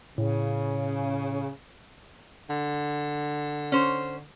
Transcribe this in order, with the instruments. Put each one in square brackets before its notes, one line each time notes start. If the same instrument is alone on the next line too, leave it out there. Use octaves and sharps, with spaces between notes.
[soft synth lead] A2 [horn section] C#3
[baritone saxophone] D3
[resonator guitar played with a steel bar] C#4 C5